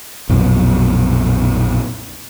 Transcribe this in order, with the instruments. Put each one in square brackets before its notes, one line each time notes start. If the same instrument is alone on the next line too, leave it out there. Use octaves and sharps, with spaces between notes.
[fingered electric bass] A#1 F2 B2 F#3